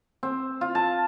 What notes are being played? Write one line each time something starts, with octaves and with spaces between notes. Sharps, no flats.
C4
F4
A5